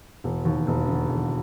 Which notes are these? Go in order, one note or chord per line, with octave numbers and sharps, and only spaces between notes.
E1
D#2
E1
D3
E1